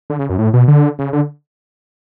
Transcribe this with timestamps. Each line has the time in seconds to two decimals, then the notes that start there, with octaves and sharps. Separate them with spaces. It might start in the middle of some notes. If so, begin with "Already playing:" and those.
0.10 D3
0.19 C#3
0.29 F#2
0.39 A2
0.53 B2
0.68 D3
0.99 C#3
1.13 D3